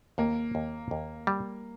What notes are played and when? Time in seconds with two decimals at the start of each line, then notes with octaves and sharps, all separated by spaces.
0.18 D#2 A#3
0.55 D#2
0.91 D#2
1.27 G3